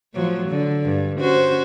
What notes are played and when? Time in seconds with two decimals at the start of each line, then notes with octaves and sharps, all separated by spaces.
0.14 A2 F3 F#3
0.49 D3
0.85 G2
1.20 C#4 F#4 C5